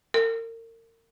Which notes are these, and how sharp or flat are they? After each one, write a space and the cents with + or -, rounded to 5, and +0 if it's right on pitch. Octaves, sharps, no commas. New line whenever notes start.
A#4 -35